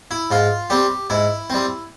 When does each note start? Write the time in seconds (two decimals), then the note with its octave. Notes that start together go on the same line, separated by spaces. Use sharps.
0.11 E4
0.31 G#2 F4
0.70 G3 C4 G4
1.10 G#2 E4
1.50 G3 C4